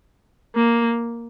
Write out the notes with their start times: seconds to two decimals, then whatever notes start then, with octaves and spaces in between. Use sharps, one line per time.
0.56 A#3